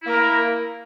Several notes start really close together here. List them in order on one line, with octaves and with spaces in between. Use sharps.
E4 A#3 A#4